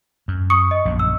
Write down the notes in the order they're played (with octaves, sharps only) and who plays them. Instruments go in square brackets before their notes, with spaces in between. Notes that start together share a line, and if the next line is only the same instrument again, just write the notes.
[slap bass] F#2
[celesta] C#6 D#6 C#7
D#5
[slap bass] A#1 F#2
[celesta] E6